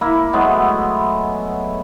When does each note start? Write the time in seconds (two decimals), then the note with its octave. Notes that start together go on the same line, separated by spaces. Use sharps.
0.01 A#3 E4 B5
0.33 F#3 G#3 A3 B3